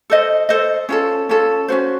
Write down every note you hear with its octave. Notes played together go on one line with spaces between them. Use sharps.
A4 C5 D#5
A4 C5 D#5
C#4 F4 A4
C#4 F4 A4
C#4 F#4 C5